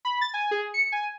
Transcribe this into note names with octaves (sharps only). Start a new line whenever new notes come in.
B5
A6
G#5
G#4
C#7
G#5